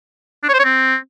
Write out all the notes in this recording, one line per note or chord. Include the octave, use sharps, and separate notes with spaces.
D4
C#5
C5
C#5
C4